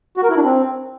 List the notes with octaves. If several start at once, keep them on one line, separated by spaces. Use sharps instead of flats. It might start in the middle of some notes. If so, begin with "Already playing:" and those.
F#4
A#4
E4
D4
C4